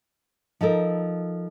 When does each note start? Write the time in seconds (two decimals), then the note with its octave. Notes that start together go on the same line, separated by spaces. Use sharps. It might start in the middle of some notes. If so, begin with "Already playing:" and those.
0.61 F3 D#4 A4 A#4